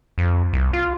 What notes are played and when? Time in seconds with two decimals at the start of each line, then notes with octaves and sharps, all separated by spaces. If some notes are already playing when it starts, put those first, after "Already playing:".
0.18 F2
0.53 C2
0.73 F4